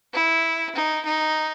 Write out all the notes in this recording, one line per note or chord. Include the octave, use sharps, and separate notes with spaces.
E4
D#4
D#4